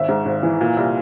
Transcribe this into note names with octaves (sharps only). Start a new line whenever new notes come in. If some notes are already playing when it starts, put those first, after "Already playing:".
Already playing: G#1 E5
G#2
G#1
E3
A#2
C2